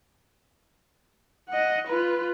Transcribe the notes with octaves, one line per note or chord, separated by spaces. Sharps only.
D#5 F#5
F4 B4